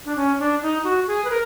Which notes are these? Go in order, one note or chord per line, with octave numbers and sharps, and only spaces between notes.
D4
C#4
D4
D#4
F#4
G#4
B4
A#4